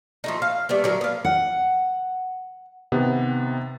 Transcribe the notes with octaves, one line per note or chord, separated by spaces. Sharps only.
F3 A3 D#4
F5
G3 A3 B3
D3 F#3 A#4
B3 F5
F#5
C3 D#3 B3 G4